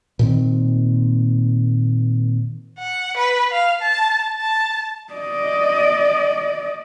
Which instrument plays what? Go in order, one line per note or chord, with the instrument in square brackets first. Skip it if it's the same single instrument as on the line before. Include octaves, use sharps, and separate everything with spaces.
[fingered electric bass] A#2 D#3 C4
[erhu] F#5
B4
F5
A5
A5
[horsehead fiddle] D5 D#5